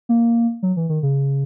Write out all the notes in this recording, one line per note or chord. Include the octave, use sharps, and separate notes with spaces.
A#3
F#3
E3
D#3
C#3